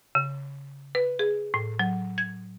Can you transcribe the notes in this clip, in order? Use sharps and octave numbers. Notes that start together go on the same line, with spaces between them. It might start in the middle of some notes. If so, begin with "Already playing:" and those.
C#3
B4
G#4
A2
F#3
G#6